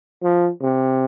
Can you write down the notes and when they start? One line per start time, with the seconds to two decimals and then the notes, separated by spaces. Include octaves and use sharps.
0.23 F3
0.62 C3